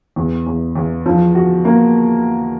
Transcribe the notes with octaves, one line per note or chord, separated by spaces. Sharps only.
E2
E2
E2
F3
F#4
A#3